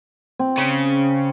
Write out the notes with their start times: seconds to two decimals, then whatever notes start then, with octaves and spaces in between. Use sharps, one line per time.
0.39 C4
0.58 C#3